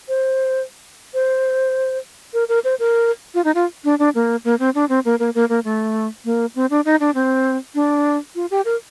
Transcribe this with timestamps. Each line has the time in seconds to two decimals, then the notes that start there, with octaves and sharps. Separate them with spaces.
0.09 C5
1.14 C5
2.34 A#4
2.49 A#4
2.64 C5
2.79 A#4
3.34 F4
3.44 D#4
3.55 F4
3.84 D4
3.99 D4
4.15 A#3
4.45 A#3
4.59 C4
4.75 D4
4.89 C4
5.05 A#3
5.19 A#3
5.35 A#3
5.49 A#3
5.64 A3
6.25 A#3
6.55 C4
6.70 D4
6.85 D#4
7.00 D4
7.15 C4
7.75 D4
8.35 F4
8.51 G4
8.65 A#4